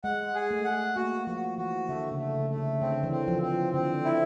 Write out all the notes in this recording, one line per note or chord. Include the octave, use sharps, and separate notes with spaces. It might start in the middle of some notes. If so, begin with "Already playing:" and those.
G#3 F#5
G#4
A3
F#5
A#3 F#4
F3 F#4
E3 F#4
D3 A3
C#3
A3
C#3
A3
C#3
D3 C4
E3
C4
F3
C4
D3 C4
E4